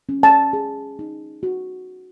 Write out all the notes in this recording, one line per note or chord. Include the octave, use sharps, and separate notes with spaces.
C#4
A5
G#4
D#4
F#4